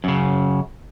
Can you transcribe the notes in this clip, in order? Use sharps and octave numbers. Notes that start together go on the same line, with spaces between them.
F#2 C#3